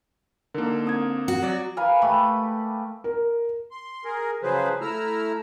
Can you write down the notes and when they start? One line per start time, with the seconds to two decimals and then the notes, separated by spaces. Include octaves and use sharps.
0.54 D3 A#3 D#4 A#4
0.85 C4 D#6 G#6
1.28 F#4
1.42 F#3 D5
1.77 A#4 B4 F5 G#5
2.02 A3 G4 B5
3.04 A#4
3.71 C6
4.05 G#4 A#4
4.43 C#3 F3 F#3 G#4 B4 C5
4.81 A3 E4 A#5 E6 F6